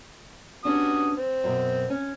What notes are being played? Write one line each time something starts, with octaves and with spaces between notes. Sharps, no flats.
G3 B3 C#4 D4 F#4 D#6
C4
F#2 B2
C#4